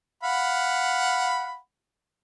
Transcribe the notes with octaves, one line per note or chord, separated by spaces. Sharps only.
F5 F#5 B5